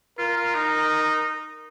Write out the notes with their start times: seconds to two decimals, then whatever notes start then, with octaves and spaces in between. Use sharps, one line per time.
0.18 F4 A#4
0.37 F4
0.55 D#4